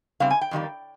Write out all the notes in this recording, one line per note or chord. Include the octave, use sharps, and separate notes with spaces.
C#3 G3 C4 F5
G#5
G5
F2 D#3 G3 A#3